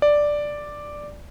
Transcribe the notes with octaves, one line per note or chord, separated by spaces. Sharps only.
D5